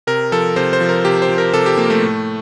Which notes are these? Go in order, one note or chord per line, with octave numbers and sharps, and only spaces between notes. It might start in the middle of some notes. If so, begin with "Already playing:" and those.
C3 A#4
F3 A4
C3 C5
C5
F3
A#4
C3 G4
C5
F3
A#4
C3 A4
G4
F3 A#3
A3
A2